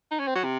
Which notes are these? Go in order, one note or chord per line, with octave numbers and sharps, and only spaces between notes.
D#4
C#4
C4
F#3
C3